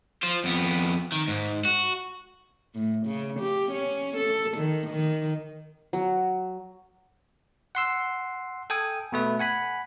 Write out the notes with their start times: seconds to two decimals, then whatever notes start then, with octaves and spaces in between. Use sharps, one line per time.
0.23 F4 C5
0.44 F2 B3
1.12 D#3
1.28 G#2
1.65 F#4
2.74 A2
3.06 C#3
3.39 G4
3.72 C#4
4.16 A4
4.57 D#3
4.90 D#3
5.93 F#3
7.75 F#5 C6 E6
8.70 A4 G5 G#5 D#6
9.12 B2 A3 B4
9.39 F#5 G#5 B5